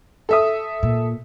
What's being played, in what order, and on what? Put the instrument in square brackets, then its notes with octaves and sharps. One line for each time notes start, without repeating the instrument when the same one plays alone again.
[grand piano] A4 E5 D#6
[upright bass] A#2